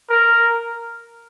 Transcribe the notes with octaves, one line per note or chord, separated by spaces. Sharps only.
A#4